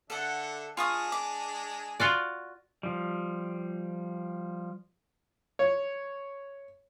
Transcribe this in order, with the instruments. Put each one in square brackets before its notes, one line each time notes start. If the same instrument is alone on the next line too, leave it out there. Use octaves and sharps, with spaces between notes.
[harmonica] D3 D4 E5 [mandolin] A4 F#5
[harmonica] G#3 D4 G#4 [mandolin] F4 C#6 D#6
[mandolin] D6
[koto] F4 F#4 D5
[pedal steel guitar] F3 G3
[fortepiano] C#5